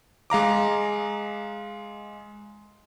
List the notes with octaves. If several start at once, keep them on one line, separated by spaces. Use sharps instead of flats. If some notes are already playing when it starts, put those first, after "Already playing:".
G#3 F5 A#5 D6